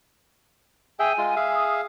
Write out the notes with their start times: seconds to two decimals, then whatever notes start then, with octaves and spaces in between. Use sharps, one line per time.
0.99 G#4 E5 G5 G#5
1.18 G#3 F4
1.36 G#4 E5 F5
1.52 D#6